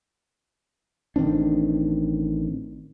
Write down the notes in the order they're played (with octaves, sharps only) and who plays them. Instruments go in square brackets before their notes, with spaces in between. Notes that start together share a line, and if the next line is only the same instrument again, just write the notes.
[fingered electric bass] A1 D#3 C4 D4